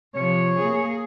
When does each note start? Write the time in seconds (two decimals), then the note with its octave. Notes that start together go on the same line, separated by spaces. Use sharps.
0.15 C3 F3 C#5
0.58 A#3 G#4